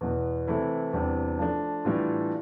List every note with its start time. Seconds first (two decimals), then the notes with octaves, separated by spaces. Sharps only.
0.01 E2 B2 B3
0.47 C3 E3 A3 E4
0.93 E2 C3 G3 D4
1.39 F3 A3 D4
1.85 A2 E3 G3 D4 F4